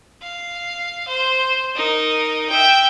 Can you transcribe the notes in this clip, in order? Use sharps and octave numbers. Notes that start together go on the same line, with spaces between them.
F5
C5
D#4 A#4
E5 G5